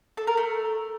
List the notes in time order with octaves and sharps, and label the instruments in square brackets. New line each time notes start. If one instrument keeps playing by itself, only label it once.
[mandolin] A4
A#4
A3